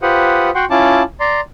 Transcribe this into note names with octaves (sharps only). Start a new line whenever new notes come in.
F4 G4 B4 C5 F#5 D#6
F#4 F#5 G5 C6
C#4 E4 F4 A5 D6
D5 A#5 C6